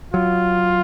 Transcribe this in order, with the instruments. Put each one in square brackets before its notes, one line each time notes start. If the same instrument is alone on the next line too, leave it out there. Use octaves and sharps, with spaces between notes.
[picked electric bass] F#3 [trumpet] F4